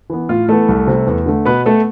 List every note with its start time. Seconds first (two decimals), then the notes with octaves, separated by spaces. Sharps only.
0.10 E3 B3
0.29 A2 F4
0.48 E3 A3 B3 A4
0.69 C2
0.87 C3 G3
1.07 E2
1.26 D3 A3
1.45 B2 B3 B4
1.65 A3 B3 A4